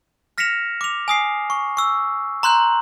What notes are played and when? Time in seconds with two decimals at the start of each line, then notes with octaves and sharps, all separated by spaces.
0.38 F6 A#6 B6 C#7 E7 F7
0.81 D6 F7
1.08 G#5 D#6 C7
1.50 C#6
1.77 C#6 E6
2.43 A#5 C6 F#6 G6 F#7